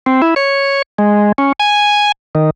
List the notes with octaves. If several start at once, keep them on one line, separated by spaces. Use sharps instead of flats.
C4
E4
C#5
G#3
C#4
G#5
D#3